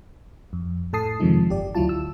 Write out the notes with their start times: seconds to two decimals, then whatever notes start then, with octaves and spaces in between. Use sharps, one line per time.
0.53 F2
0.93 A2 A4 A5 D#6 C7
1.20 F2 C3 D#3 F3 G#3 D#4
1.49 G1 G4 D5
1.75 D2 F#3 E4 F4 A5
1.89 E6